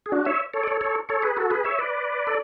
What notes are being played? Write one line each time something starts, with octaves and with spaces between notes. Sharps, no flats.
G#4
D4 F#4
C#5 E5
A4 C#5
D5
A4 C#5
A4 C#5
A4 C#5
G#4 B4
F#4 A4
G#4 B4
C#5 E5
B4 D5
A4